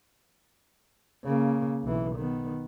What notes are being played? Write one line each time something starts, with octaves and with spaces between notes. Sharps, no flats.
C#3 A#3
B1 E3
D#3 B3